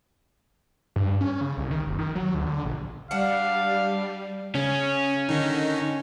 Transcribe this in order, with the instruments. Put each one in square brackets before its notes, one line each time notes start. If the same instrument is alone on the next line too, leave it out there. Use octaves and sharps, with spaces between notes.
[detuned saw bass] G2
C#4
C#3
C2
D#3
F#1
D#3
F#3
D2
D3
A#1
[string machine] G3 [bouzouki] D4 F#5 [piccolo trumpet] F5
[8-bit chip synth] C#3 [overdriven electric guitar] C#4
[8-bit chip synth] D3 D#3 D#4